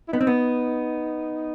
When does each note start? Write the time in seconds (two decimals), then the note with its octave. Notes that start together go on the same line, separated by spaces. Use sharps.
0.08 E4
0.12 B3 D#4
0.21 C4
0.27 B3